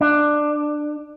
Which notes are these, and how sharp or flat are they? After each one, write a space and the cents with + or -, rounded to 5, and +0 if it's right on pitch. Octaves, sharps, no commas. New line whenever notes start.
D4 +15